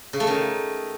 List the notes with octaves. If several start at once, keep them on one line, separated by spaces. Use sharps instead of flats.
C#3
A3
D#3